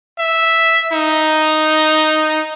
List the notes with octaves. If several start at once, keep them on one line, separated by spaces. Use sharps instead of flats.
E5
D#4